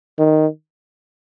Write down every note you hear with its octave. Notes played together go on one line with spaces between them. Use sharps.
D#3